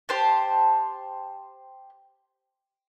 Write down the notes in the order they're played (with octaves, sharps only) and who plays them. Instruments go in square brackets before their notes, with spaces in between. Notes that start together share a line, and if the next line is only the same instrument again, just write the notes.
[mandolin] G4 C5 A5